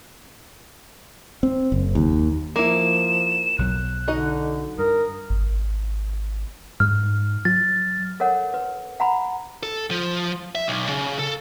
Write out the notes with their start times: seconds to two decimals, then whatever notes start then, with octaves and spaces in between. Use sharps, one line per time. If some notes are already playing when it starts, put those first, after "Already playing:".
1.43 C4
1.72 F#1
1.95 D#2
2.56 F3 A#3 E4 E7
3.58 B1 F#3 F#6
4.08 D3 D#4 F#4 D#5
4.78 G2 A#4 D#6
5.30 G#1
6.80 G#2 F6
7.45 F#3 A6
8.20 A4 A#4 C#5 F#5
8.54 B4
9.00 F#5 A#5 B5
9.63 A4
9.91 F3
10.55 E5
10.68 B1
10.89 C#3
11.19 A4